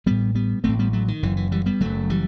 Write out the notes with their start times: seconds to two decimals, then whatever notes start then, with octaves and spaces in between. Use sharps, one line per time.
0.06 A1 A2 G3 B3
0.35 G3 B3
0.64 A1 A2 A3 C4
0.79 G3 B3
0.93 F#3 A3
1.08 D#3
1.23 F#1 F#2 E3
1.37 E3
1.52 E3 G3
1.66 G3 B3
1.80 F#1 F#2 F#3 A3
2.10 E3 G3